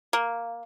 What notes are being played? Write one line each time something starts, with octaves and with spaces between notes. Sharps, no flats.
A#3